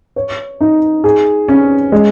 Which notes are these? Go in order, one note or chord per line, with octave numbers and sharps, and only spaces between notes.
C#5
D#4
G#4
C#4
G#3